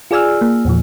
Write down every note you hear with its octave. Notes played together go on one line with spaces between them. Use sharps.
F4 G#4 D5 G#5 E6 F6
A#3
E2 A#2 F3